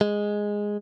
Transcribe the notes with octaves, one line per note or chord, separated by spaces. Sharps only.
G#3